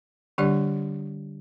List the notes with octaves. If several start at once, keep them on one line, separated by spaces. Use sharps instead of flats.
D3 G3 D4 G4 D5